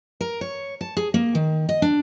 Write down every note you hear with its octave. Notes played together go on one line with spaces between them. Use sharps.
A#4
C#5
A5
G#4
A#3
D#3
D#5
D4